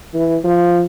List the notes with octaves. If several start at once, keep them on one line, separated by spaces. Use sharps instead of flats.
E3
F3